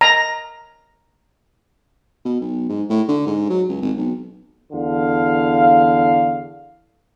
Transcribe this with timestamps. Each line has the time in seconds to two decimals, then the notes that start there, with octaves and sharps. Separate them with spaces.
0.01 A#5
2.25 B2
2.40 B1
2.69 G#2
2.90 A2
3.09 D3
3.27 G#2
3.50 F#3
3.68 C#2
3.81 G#1
3.97 B1
4.72 E2 D3 F5